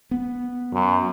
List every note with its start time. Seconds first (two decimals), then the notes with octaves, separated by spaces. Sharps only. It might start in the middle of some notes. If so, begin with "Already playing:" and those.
0.11 B3
0.73 F#2